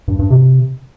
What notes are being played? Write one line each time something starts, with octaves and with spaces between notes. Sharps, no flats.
G2
G2
C3